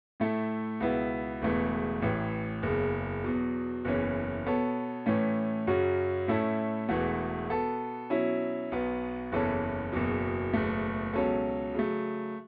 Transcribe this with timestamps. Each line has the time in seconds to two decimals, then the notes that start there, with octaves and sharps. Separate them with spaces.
0.20 A2 A3 E4 A4
0.80 C#2 B2 B3 E4
1.42 E1 E2 C#3 E3 A3
2.02 A1 A2 E3
2.63 F#1 E2 C#3
3.24 E2 B2 F#3
3.85 F#1 E2 E3 C#4
4.46 B2 B3 A4 C#5
5.06 A2 E3 A3 C#4
5.67 F#2 C#3 F#3 C#4 F#4
6.28 A2 A3 C#4 E4 A4
6.89 E1 E2 E3 A3 F#4
7.50 B2 B3 A4
8.10 B2 F#3 C#4 E4
8.72 B1 B2 B3
9.32 F#1 E2 E3 C#4 A4
9.93 F#1 E2 B2 F#3
10.54 F#1 E2 B2 A3
11.14 C#2 B2 F#3 C#4 A4
11.74 C#3 F#3 A3